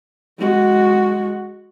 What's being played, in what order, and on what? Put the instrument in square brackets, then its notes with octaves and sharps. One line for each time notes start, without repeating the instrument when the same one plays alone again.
[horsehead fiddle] G#3 F#4